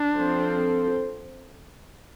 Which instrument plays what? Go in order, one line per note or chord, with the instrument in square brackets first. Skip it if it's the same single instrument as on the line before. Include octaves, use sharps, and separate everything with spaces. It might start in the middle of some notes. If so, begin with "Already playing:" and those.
Already playing: [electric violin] D4
[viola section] F3 C4 A4 C5